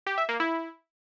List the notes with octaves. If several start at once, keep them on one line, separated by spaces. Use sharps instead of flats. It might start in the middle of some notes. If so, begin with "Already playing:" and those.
G4
E5
A#3
E4